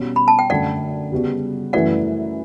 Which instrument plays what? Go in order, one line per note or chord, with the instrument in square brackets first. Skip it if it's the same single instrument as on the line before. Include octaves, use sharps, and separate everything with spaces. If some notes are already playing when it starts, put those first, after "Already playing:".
Already playing: [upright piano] B2 G3 C#4
[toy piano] B5
A5
G5
[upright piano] F#2 D3 A3 [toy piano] D5 F#5
[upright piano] C#3 G3 B3 F#4
[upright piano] F#2 E3 A3 E4 B4 [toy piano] D5 F#5